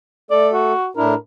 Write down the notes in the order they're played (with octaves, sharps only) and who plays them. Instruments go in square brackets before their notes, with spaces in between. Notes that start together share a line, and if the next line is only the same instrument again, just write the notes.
[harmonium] A3 A4 [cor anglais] D5
[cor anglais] F#4
[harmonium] A2 D4 E4 [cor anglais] A#4